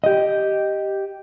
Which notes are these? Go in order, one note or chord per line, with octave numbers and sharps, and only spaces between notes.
G4 D#5